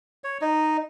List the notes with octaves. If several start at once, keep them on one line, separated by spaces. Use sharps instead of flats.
C#5
D#4